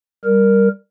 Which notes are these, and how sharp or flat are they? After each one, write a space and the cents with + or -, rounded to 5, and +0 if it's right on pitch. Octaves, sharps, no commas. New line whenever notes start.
G3 +0 A#4 +0